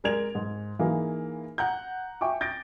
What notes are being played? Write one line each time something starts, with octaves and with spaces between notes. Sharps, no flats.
G#3 A#4 D5 G#6 F7
G#2
E3 A#3 D#4 G#4
F#5 A#5 G6
E5 G5 G#5 C#6 D6
G6 A6 A#6 D7